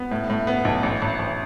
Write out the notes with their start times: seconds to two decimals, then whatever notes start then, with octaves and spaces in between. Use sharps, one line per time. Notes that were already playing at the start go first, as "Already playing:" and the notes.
Already playing: B3
0.11 A2
0.30 A2
0.47 B3
0.65 B1
0.83 A1
1.02 A1
1.19 A1